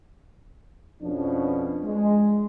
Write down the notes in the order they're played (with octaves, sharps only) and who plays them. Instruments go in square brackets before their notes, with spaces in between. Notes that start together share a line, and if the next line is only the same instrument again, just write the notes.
[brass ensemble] F2 B2 F3 C#4 D4
G#3